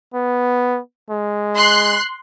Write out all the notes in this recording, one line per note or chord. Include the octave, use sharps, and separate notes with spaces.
B3
G#3
C6 F#6